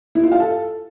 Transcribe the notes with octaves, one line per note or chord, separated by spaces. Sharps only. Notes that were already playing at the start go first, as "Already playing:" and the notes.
E4
F4
F5
A4